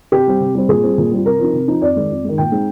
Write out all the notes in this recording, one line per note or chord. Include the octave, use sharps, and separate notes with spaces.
C3 G4
G3 C4
C3
G3 C4
A#2 G#4
G3 C4 F4
A#2
G3 C4 F4
C3 A#4
F3 C4 D#4
C3
F3 C4 D#4
F2 D5
D#3 G#3
F2
D#3 G#3
A#2 G5
G#3 C4 D#4